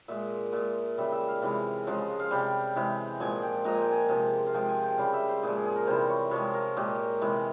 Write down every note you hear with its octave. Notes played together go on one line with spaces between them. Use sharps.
A#2 G#3 E5
A#2 G#3
C#3 G3 E5
E5
F5
C3 E3 G#3
C#3 F3 G#3
F5
C3 G3 G5
C3 E3 G#3
A#2 F3 G#3 G#5
G5
A#2 F3 G#3 A#5
G#5
G5
G#5
C3 F3 G#3
F5
C3 F3 G#3 G5
G#5
G5
C#3 G3 F5
E5
C5
A#2 F3 G#3 G#4
G#4
G#4
A#4
C3 E3 G3 C5
C#5
C3 F3 G#3 C#5
A#4
A#2 G#3 G4
C3 E3 G#3